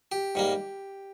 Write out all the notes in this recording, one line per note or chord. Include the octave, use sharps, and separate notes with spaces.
G4
G#2 G3 A#3